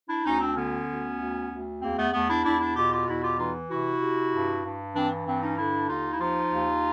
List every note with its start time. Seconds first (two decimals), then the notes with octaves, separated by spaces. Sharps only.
0.09 D4 E4
0.25 D2 C#4 D#4
0.41 C4 D4
0.56 D3 B3 C#4
0.88 D2
1.19 D2
1.50 D2
1.81 E2 A#3 C4
1.97 A3 B3
2.13 E2 A3 B3
2.28 D4 E4
2.44 E2 D4 E4
2.60 D4 E4
2.75 B2 F4 G4
2.91 F4 G4
3.06 E2 E4 F#4
3.22 F4 G4
3.38 E3 D#4 F4
3.69 C3 E4 F#4
4.01 C3
4.32 G2
4.64 G2
4.94 E3 C4 D4
5.26 G2 C4 D4
5.42 C#4 D#4
5.57 D3 D4 E4
5.89 D#2 D#4 F4
6.11 E4
6.20 F3 D#4 F4
6.52 D#2